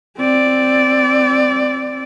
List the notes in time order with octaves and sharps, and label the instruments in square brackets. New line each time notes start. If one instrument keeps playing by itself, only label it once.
[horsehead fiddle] C4 D5